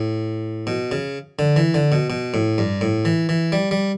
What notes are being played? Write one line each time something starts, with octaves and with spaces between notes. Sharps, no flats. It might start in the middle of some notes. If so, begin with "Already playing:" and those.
Already playing: A2
B2
C#3
D3
E3
D3
B2
B2
A2
G2
A2
E3
E3
G3
G3